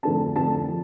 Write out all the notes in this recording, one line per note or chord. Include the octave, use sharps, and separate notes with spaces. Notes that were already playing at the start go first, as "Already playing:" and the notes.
F2 D3 A3 D4 A5
F2 D3 A3 D4 A5
F3